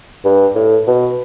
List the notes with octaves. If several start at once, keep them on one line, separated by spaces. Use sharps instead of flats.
G2
A2
B2